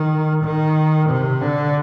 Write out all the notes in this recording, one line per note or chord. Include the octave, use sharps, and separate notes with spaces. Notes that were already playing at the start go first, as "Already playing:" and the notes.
Already playing: D#3
D#3
C3
D3